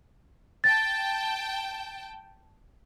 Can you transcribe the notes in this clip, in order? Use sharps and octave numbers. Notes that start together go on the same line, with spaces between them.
G5 A5 A6